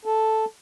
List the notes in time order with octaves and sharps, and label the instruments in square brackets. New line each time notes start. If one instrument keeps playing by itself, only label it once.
[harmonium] A4